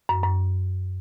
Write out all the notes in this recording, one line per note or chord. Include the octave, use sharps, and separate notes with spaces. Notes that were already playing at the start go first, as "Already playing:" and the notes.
F#2
F#2